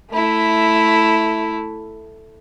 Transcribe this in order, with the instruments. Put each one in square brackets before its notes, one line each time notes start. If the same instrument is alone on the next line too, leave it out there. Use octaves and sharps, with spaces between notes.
[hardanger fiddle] A3 E4